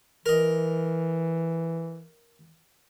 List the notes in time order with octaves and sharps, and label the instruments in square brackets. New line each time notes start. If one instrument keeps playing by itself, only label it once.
[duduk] E3 [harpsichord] A#4 D#5